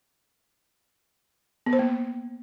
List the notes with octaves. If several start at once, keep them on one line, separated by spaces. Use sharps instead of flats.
B3
C5
A#3